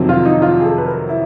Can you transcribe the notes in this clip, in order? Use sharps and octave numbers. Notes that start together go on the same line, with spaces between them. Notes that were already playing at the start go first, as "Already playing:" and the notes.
Already playing: F2 C3 D#3 F#3
F4
D#4
F4
G#4
A4
B4
A#4
E4